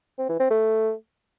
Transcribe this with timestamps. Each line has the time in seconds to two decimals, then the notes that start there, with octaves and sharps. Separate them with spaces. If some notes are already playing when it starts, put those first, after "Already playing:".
0.18 C4
0.29 E3
0.40 C4
0.50 A3